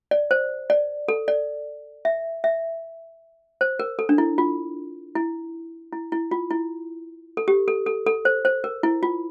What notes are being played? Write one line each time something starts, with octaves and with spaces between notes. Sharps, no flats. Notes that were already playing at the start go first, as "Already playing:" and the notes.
D5
C5
D5
A4
D5
E5
E5
C5
A#4
A4
D4
E4
F4
E4
E4
E4
F4
E4
A4
G4
A4
A4
A4
C5
C5
A#4
E4
F4